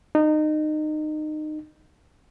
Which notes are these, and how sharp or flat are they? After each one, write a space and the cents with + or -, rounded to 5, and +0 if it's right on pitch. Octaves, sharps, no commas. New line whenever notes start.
D#4 -25